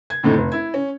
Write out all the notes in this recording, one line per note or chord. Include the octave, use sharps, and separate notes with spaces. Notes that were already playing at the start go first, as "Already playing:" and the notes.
G#6
F2 A2 D3 A3 D#4
F1
E4 G#6
C#4